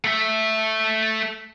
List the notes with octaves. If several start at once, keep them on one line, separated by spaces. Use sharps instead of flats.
A3 E5